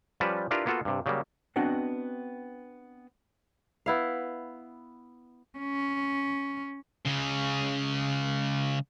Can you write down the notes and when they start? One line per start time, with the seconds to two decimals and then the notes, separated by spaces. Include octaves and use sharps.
0.20 F3 G3 C#4 B4 D5 A5
0.51 D4 E4 F4 G4 A#4 B4
0.66 A#3 B3 F4 F#4 A4
0.85 G2 C3
1.06 C#3 F#3 G3 A#3
1.56 B3 C4 D4 F#4 D#5 F#5
3.86 B3 E4 F5
5.58 C#4
7.06 C#3 G#3